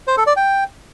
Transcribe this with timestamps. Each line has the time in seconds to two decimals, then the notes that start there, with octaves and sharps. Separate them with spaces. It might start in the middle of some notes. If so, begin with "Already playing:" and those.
0.08 C5
0.17 A4
0.27 D5
0.36 G5